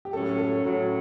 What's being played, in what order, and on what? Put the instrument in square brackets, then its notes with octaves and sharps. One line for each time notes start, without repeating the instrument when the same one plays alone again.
[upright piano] G4
[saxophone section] A2 F#3 C#4 [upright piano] A4
[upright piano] A4
[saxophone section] A2 F#3 C#4